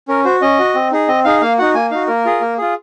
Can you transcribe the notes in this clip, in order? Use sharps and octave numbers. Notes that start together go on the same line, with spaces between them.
C#4 A#4
F#4 C5
C#4 D#5
F#4
C4
D#4 G#4
C4 D#5
D#4 G#4 F5
A#3 F5
D#4 F#4 F#5
A#3 G#5
D#4 F#4 F5
A#3 A#4
F4 G#4
A#3
F4 G#4